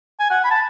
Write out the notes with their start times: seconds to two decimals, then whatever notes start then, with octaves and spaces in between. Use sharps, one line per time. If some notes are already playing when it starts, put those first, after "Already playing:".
0.20 G#5
0.31 F#5
0.44 B5
0.51 A5